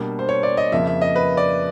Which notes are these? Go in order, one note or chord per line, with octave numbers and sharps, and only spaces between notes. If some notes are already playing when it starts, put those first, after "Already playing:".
Already playing: B2 G3 A#3 D4
C5
C#5
D5
D#5
F2 C#3 F3 A#3 E5
E5
D#5
B4
D5